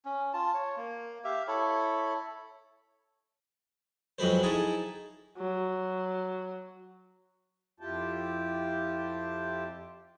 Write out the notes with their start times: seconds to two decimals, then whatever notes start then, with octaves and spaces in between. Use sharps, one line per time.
0.05 C#4
0.33 F4 A5
0.54 C#5
0.77 A#3
1.24 G4 E5 F5
1.48 E4 A4 C#5 B5
4.18 F2 F#3 G#3 B4 C5
4.43 D#4 E4 G#4 A4
5.38 F#3
7.80 F2 E4 F4 G4 G5 A5